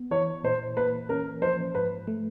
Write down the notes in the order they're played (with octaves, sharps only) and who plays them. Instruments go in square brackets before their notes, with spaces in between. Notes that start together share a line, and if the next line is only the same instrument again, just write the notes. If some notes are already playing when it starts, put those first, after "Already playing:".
Already playing: [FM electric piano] B3
[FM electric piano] E3 [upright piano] C#5
[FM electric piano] A#2 [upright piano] C5
[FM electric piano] A#3 [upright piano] B4
[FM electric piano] C#4 [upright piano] A#4
[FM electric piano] F3 [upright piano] C5
[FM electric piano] G#2 [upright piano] B4
[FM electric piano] A3